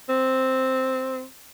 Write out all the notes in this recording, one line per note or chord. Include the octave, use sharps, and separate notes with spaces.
C4